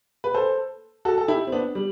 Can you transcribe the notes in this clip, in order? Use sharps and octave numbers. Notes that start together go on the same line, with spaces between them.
B4
A4 C5
F#4 A4
A4
E4 G4
C4
B3 D4
G3